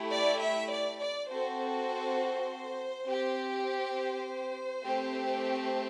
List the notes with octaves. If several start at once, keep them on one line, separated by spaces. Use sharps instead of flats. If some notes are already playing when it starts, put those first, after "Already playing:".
Already playing: A3 E4 G4
D5
E5
D5
D5
C4 F#4 A4 C5
C5
C4 G4
C5
A3 C4 G4